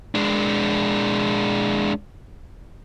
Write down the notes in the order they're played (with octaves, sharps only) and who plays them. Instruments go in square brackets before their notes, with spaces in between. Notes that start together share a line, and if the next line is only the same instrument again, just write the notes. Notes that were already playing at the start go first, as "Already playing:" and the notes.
[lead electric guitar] G#3 D4